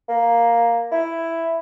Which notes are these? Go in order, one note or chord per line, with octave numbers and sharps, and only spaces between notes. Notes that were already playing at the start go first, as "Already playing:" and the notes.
A#3
E4